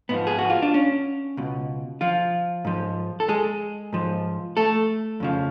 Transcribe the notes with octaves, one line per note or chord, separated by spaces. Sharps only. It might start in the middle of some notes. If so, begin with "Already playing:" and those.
G#2 F3 B3
G#4
F#4
F4
D4
C#4
C#2 B2
F3 F4
G#2 F3
A4
G#3 G#4
G#2 F3
A3 A4
F2 C#3 F3